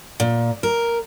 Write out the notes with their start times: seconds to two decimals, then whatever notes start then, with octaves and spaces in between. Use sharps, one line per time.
0.20 A#2
0.63 A#4